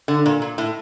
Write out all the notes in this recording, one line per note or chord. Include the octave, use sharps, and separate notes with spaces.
D3
A#2
A#2
A2